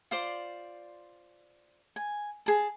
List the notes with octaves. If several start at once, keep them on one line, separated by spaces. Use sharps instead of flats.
F4 C5 D5
G#5
G#4 A5